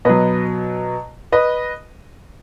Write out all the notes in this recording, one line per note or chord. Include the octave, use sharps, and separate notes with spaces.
B2 F#3 B4 D#5
B4 D#5